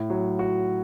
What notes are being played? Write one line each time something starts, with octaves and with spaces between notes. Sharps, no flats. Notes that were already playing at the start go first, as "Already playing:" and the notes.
Already playing: A2
F#3
F#4